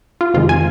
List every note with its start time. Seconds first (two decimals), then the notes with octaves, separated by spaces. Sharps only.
0.21 F4
0.34 F2 C3 D#3 G#3 F4
0.49 G#5